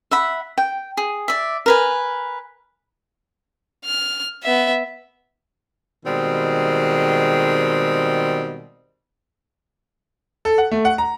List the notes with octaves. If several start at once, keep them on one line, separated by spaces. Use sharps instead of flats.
E5 F#5 B5
G5
G#4
D5 E5
A#4 B4 G#5
F6
B3 E5
B2 D#3 G3 G#3 C4
A4
F#5
A3
F#5
A#5